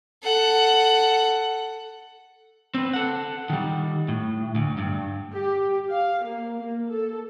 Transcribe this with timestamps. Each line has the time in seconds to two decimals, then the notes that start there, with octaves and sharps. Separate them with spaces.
0.23 A4 F#5
2.74 C4 B4
2.93 A4 F#5
3.50 D#3 G3
4.08 A2
4.55 D2
4.78 G2
5.32 G4
5.89 F5
6.24 A#3
6.60 A#3
6.90 A4